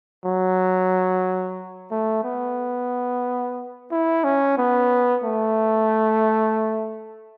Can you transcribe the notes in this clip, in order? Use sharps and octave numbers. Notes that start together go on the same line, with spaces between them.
F#3
A3
B3
E4
C#4
B3
A3